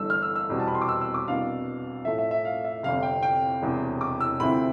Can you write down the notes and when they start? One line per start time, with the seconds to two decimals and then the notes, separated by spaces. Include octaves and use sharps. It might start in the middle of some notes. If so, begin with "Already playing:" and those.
Already playing: G1 G2 E3 A3 E6
0.10 F6
0.22 E6
0.35 E6
0.49 F1 E2 B2 G3 C4
0.60 A5
0.68 B5
0.75 C6
0.82 D6
0.88 E6
1.01 E6
1.14 D6
1.28 C2 B2 B3 D4 F5
2.05 A2 F3 A3 E5
2.19 E5
2.31 E5
2.45 F5
2.65 E5
2.83 G1 F2 C3 F5
3.03 G5
3.23 G5
3.62 E1 E2 C3
4.01 D6
4.21 E6
4.40 D2 C3 F3 C4 E4 B5